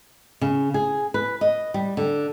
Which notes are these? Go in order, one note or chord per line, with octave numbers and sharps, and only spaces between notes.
C#3
G#4
B4
D#5
G3
D3